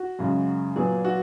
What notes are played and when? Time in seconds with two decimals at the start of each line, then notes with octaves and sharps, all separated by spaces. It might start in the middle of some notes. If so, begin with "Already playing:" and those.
Already playing: F#4
0.19 F#2 C#3 G#3
0.76 A#2 F#3 B3 G#4
1.05 F#4